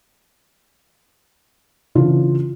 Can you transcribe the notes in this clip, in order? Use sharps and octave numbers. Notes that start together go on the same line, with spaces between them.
C#3 E3 D4 F4